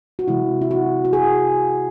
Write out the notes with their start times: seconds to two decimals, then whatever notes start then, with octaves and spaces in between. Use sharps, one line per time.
0.19 F#4
0.28 C3 E3 G#3 E4
0.62 E4
0.71 F#4
1.05 F#4
1.13 G#4